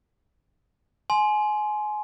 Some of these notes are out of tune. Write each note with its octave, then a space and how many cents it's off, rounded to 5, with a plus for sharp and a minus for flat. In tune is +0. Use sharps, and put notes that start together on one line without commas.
G#5 +25 C6 +0